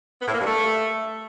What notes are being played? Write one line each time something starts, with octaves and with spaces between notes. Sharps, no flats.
B3
A2
A#3
G2
A3